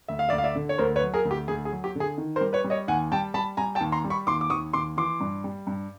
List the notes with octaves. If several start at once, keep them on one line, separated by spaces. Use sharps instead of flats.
D2 E5
F5
D2 D5 E5
F5
D5 E5
D3
C#5
D2 A#4 C5
B4 C#5
F#3
G#4 A#4
D2
G4
D2 G#4
G#4
F#3
G4
D3 G#4
D#3
A#4 C5
G3
B4 C#5
G3
C#5 D#5
D#2 F#5 G#5
G3 G5 A5
G3 A5 B5
G3 G#5 A#5
G5 A5
D#2
A#5 C6
G3
B5 C#6
D#2 C6 D6
D6
D#2 C#6 D#6
D#2 C6 D6
E3 C6 D6
G2
G3
G2